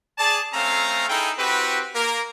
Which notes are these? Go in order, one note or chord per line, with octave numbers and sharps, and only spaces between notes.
G#4 D5 A5
A3 C4 C#4 F5 A#5
D#4 E4 G#4 A4 G5
C4 E4 F#4 G4 B4
A#3 A#4